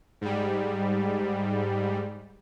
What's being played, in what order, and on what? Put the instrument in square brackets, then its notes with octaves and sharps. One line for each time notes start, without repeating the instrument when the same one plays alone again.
[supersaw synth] G#2 G3